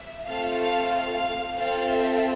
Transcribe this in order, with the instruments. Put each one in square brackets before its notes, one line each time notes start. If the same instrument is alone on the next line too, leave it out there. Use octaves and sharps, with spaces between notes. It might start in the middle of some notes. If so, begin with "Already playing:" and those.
Already playing: [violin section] E5
A3 C4 F4 A4 F5
F5
F5
C4 F4 A4 F5
E5